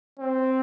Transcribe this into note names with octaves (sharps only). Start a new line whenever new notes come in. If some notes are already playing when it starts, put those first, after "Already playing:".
C4